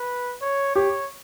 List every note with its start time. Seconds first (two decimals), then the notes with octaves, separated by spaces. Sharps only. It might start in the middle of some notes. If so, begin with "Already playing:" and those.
Already playing: B4
0.42 C#5
0.75 G4 C#5